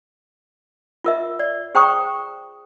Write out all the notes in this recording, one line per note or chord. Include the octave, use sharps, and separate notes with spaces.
F4 A#4 E5
D5
G#4 C5 G5 A#5 C#6 D#6